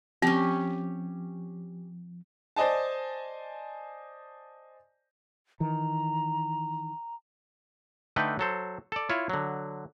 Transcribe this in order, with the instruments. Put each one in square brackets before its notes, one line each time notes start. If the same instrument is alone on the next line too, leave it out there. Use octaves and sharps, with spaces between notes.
[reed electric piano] F3 [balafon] C4 [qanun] C#4 G4
[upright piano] C5 D5 D#5 G#5 A5
[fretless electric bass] D#3 E3 [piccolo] A#5
[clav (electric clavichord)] D3 A3 D#4 B4 G5
F#3 A4 C5
A4 D5
E4 F4 C#5
D3 F#3